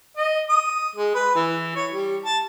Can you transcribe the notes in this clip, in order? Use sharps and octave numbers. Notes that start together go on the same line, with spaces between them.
D#5
D#6
G#3
B4
E3
C#5
G3
A5